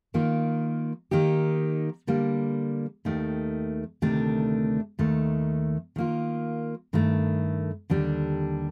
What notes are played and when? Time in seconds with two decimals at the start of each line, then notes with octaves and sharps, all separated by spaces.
0.14 D#3 A#3 F4
1.11 D#3 A#3 D#4 G4
2.07 D3 G3 A#3
3.05 D#2 D#3 A3
4.02 D2 C3 D#3 A3 D4
4.99 D#2 D#3 A3
5.96 D#3 A#3 F4
6.93 G2 D#3 A3
7.90 D#2 D3 G3 D4